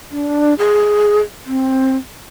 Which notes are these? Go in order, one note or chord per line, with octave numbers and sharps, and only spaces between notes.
D4
G#4
C4